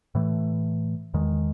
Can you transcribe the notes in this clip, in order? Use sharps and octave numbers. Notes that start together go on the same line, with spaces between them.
A2 E3 A3
E2 D#3 G#3